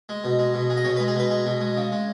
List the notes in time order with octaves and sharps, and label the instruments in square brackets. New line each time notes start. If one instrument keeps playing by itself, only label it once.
[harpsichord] G#3
B2
G#3
B2
G#3
D#5
B2 C#5
B4
G#3
G#4
B2 B4
G#3
B2
G#3
C#3
G#3